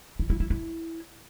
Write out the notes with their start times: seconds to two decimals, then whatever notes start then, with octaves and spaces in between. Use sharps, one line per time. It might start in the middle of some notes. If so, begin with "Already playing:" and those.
0.19 E4
0.30 E4
0.40 E4
0.50 E4